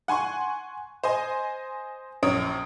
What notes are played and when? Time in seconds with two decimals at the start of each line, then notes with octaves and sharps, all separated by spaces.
0.08 F#5 G#5 C6 C#6
1.04 C5 D#5 G#5
2.23 A#1 F#2 C#5 D#6 D7